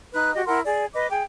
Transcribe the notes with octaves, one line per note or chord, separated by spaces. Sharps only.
D#4 B4 F#6
F#4 G4 D#5
E4 A#4 F#5 C6
G#4 D5
B4 D#5 D6
G#4 G5